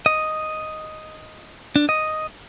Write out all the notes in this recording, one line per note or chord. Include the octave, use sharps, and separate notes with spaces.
D#5
D4
D#5